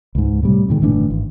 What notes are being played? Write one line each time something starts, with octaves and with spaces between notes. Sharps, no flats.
C#2 G#2
A2 C3 G3
G2 A#2 D#3 G#3
G1 A2 E3 D4
G#1